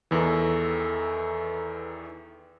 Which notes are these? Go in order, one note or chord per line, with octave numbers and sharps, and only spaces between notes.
E2 D#3 E3 A4 E6